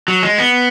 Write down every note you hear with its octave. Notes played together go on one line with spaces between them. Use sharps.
F#3
G#3
B3